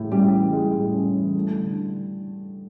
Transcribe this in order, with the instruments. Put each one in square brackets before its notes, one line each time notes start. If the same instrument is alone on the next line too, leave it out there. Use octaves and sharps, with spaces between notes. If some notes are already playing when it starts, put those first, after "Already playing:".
Already playing: [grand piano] A2 E3 G#3
[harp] G3 [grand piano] C#4
[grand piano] E3
G#3
A2
C#4
E3
A3
D3